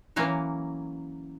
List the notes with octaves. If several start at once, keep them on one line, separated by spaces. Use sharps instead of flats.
E3 F#3 A#3 C#4